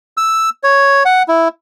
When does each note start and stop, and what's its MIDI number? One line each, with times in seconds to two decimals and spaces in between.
0.17 0.49 88
0.64 1.03 73
1.05 1.23 78
1.28 1.48 64